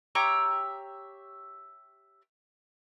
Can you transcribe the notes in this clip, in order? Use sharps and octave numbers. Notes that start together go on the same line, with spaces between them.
G4 C#5 E5 A#5